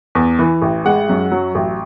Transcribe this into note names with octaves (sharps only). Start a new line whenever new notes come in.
E2
E3
A1
G#3 F#5
F#2
F#3
A1